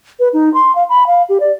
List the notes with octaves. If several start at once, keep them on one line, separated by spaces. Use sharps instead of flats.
B4
D#4
C6
F5
B5
F5
G4
D5